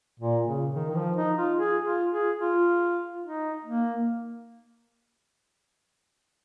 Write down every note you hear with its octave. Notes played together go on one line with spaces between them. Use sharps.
A#2
C#3
D#3
D#3
F3
D#4
F4
G#4
F4
G#4
F4
D#4
A#3